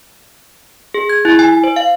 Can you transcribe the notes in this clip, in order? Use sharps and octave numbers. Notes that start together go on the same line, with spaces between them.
G#4
G#6
E4
G#5
C5
F5